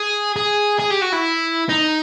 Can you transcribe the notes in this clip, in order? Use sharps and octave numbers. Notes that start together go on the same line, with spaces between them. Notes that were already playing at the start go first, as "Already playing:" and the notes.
Already playing: G#4
G#4
G#4
G4
F#4
E4
D#4